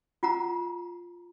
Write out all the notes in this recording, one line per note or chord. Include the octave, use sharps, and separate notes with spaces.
F4 F#5 A#5